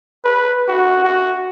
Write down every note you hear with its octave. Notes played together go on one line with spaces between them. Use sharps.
B4
F#4
F#4